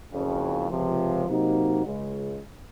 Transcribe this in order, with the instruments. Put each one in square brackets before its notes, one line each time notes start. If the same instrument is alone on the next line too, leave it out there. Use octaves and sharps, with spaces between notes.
[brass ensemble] F#1 F2 C#3
C#2 C3 F3
C3 F#3 A#3 D#4 F#4
C#2 C#3 G#3